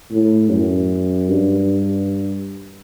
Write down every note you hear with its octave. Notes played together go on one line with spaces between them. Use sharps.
A2
F#2
G2